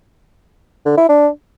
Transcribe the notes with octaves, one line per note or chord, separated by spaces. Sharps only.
D3
E4
D4